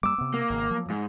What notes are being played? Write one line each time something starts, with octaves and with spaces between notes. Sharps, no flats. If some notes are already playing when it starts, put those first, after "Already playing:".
G3 A#3 D6 E6
C3 B3
A#3
G#1 C#3
F3 F#3
G#2